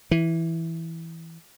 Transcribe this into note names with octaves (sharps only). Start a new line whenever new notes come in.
E3